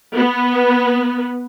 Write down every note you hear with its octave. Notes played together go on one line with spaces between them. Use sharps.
B3